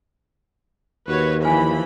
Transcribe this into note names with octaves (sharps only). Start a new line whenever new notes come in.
D#2 F#4 B4 C#5
E3 F3 C5 G#5 B5